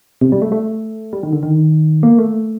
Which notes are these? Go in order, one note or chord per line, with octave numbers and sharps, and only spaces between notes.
C3
G3
A3
A3
G3
D#3
D3
D#3
A#3
A3